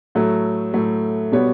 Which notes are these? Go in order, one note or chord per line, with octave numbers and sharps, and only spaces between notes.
A2 F#3 A3
A2 F#3 A3
B2 G3 B3 F#4 C#5